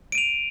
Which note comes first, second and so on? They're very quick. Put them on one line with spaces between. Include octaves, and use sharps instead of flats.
D7 D#7 F7